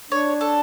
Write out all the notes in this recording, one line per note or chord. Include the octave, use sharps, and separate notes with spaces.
D4 C#5
A4